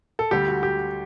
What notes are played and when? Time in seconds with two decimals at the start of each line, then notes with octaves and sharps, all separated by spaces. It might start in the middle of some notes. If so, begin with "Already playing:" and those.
0.19 A4
0.31 D2 D3 G3 G4
0.48 F#4
0.63 G4